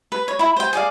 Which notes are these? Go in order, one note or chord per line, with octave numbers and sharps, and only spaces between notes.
B4
C#5
E4 B5
C5 G5
G#4 D5 F5